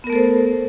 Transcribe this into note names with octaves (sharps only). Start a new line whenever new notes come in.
A3 B3 A4 A#4 C5